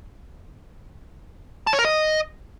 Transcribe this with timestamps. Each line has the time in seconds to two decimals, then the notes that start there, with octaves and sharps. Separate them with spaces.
1.67 A5
1.73 C#5
1.79 A#4
1.85 D#5